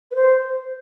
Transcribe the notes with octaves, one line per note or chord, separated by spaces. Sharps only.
B4
C5